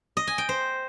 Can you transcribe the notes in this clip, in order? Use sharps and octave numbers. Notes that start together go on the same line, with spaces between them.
D#5
G#5
G5
C5